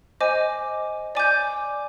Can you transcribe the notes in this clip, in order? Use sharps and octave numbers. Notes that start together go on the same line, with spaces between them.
C5 D#5 G#5 D6
D5 G#5 D6 G6